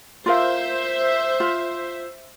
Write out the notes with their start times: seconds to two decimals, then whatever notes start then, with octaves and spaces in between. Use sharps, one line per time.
0.26 F4 A#4 C5 E5 F5
1.40 F4